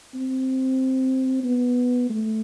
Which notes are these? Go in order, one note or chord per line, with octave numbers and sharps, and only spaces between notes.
C4
B3
A3